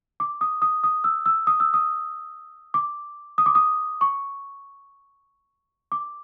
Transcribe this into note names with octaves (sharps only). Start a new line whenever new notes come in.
D6
D#6
D#6
D#6
E6
E6
D#6
E6
D#6
D6
D#6
D6
D#6
C#6
D6